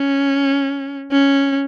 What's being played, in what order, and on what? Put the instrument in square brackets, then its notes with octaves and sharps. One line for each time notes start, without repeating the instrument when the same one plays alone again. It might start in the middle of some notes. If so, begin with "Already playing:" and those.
Already playing: [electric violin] C#4
C#4